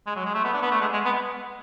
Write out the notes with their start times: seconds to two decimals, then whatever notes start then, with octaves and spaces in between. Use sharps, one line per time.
0.07 G#3
0.16 F#3
0.25 G#3
0.34 A3
0.44 B3
0.53 D4
0.62 B3
0.71 A3
0.81 G#3
0.93 G#3
1.05 B3